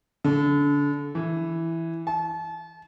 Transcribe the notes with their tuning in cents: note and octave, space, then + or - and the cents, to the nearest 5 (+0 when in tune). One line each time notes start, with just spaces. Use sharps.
D3 -30
E3 +0
A5 -35